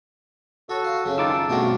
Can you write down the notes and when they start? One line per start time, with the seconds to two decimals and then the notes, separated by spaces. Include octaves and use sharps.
0.69 F#4 A4 C#5
0.84 F4
1.05 F#2 C#3
1.18 D#3 D#4 F4 A5 D6 E6
1.36 F#2
1.50 G2 B2 A3 C4 D4 F4 F#4